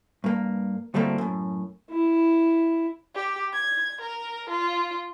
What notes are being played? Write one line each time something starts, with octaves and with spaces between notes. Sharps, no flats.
G2 A#3
D2 A2 G3 A3 A#3 C4
F#2 A2
E4
G4
G#6
A#4
F4